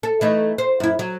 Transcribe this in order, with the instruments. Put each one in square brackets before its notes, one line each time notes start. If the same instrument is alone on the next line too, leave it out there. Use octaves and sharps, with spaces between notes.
[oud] A4
E3 A3 D#4
C5
F#2 E4
F#3